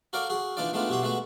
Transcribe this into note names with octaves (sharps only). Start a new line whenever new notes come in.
F#4 A4 A#4 D5 F5
F#4 G#4
E3 A#3 D4 D#4 F4 D5
G#3 A3 B3 D4 D#4 F4
B2 F#4 G4 E5 C6
G#3 A3 B3 F#4 E5